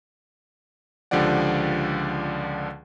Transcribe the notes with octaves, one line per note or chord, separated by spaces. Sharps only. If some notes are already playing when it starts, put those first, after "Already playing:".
C#2 D3 F3 G4 D5 F#5